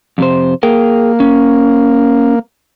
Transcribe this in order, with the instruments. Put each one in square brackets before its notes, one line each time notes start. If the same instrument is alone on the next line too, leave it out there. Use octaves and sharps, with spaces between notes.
[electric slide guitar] F2 C3 C5
[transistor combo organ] A#3 [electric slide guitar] G#4 A#4 G5
[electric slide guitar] C#4